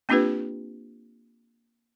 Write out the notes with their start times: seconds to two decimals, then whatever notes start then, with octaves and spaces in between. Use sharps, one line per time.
0.09 A#3 C4 D4 F4 G4 B4